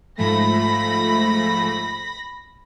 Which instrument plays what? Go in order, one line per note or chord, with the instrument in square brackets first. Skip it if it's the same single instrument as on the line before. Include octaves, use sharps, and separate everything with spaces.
[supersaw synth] G#2 F3 A3 [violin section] B5 A#6